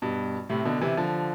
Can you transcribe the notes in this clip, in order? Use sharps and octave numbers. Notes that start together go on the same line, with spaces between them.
G2 B2
A2 C3
B2 D3
C3 E3
D3 F3